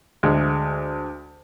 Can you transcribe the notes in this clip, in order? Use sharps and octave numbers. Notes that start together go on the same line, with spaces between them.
D2 G#3